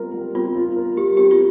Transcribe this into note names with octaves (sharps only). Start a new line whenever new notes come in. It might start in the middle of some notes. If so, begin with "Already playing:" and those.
Already playing: G3 C4 F4 A#4
G3
C4 F4
F4
A#4
G3 G4
C4 G4
F4